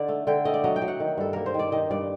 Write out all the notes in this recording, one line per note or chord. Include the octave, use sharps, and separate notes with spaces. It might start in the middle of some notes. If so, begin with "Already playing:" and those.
Already playing: D3 D#4 D5
A3
D3 G5
A3 D#5
D5
F#3 D#5
G5
F#3
F#5
D#3
G2 A4
A#3 A#4
C5
D#3 D5
D#3 D#5
G2 D5